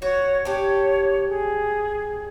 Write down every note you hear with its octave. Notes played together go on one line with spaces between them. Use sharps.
F#4 C#5
D4 G4 C#5
G#4